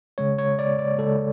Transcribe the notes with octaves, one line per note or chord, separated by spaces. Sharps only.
C#3 G#3 C#5
C#5
D5
D5
C#3 G#3 A4